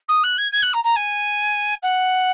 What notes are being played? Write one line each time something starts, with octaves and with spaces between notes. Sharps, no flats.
D#6
F#6
G#6
G#6
F#6
A#5
A#5
G#5
F#5